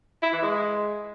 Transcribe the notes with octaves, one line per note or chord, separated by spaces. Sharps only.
E4
E3
G#3